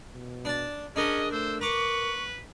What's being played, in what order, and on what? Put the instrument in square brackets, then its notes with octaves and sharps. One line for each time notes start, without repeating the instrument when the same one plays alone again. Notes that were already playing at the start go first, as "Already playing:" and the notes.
[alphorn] B2
[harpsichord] D4 A5
[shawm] C#4 [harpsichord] D4 A#4 [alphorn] G#4 [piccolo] D#5
[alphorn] A3 [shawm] C5 [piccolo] E6
[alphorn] A#4 [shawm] B4 [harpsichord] A#5 D6 [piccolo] C#6